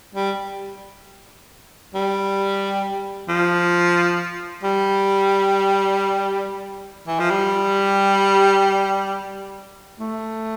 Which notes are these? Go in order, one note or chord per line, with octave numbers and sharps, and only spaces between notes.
G3
G3
F3
G3
E3
F3
G3
A3